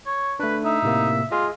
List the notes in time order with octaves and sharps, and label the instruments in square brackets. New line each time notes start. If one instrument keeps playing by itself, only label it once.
[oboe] C#5
[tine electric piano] A3 D4 [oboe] B4
[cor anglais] D#4 [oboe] E5
[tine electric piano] A2 C3 A#3
[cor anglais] F4 [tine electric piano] G#4 D#5